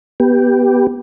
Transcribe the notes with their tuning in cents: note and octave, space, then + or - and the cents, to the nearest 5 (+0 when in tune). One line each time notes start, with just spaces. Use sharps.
B3 -10 G4 +0